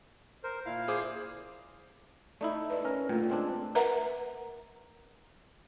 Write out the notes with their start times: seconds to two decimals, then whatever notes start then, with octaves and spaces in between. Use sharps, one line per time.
0.43 A#4 C5
0.66 A#2 E4 F5
0.88 G#4 C5 D6
2.41 A3 D#4 E4 D5
2.70 B4 D5
2.85 C#4 A#4
3.09 A#2 D3 A3 F4
3.30 G#3 C4 D4
3.75 A#4 B4 E5 F#5 A#5